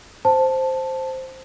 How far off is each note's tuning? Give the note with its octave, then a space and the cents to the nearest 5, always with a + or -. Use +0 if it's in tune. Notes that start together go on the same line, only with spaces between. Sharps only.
C5 +0 A5 +0